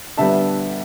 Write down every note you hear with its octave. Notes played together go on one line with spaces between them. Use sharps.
D3 G3 B3 E5 A5